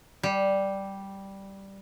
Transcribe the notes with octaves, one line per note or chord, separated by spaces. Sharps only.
G3